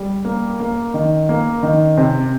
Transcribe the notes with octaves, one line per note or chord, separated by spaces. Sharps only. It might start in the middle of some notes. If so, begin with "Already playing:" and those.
Already playing: G3
A#3
A#3
D#3
A#3
D#3
C3